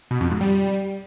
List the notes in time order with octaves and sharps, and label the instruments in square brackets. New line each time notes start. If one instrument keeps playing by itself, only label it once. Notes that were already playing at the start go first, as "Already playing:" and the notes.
[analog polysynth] B2
F2
G#2
G3